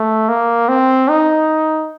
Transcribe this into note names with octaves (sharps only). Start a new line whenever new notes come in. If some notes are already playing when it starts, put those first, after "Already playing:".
Already playing: A3
A#3
C4
D#4